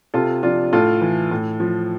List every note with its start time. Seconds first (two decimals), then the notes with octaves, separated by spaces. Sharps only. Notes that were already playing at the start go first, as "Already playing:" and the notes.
0.14 C3 F4 A4
0.43 F3 D4 F4
0.73 A2 F4 A4
1.01 E3
1.31 A2
1.60 F3